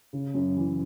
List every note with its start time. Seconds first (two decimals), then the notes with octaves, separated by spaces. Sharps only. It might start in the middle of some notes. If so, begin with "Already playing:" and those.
0.13 C#3
0.34 F#2
0.56 E3